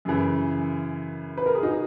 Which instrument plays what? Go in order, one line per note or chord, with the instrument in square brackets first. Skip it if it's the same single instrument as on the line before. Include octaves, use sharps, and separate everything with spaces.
[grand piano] F#2 C#3 E3
[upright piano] B4
A#4
G#4
D#4 F#4